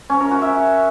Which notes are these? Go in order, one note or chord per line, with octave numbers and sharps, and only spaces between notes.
C#4
A#4
F#4
E5